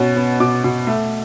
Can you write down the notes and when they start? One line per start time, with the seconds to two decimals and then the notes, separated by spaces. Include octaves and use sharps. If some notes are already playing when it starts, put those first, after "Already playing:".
Already playing: B2 C#4
0.16 B3
0.40 B2 D6
0.64 B2
0.87 A3